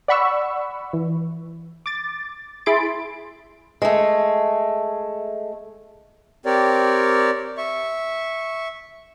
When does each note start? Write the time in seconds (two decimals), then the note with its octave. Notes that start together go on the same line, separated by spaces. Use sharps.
0.08 D5 F#5 B5 C#6 E6
0.93 E3
1.86 D6 A6
2.66 E4 G#4 B5 C6 A6 D7
3.82 G#3 A3
6.46 C4 G4 A#4 C#5 D5
7.57 E5 C#6